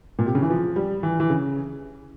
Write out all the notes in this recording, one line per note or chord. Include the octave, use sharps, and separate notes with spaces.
A#2
C3
C#3
E3
F3
G3
E3
E3
C#3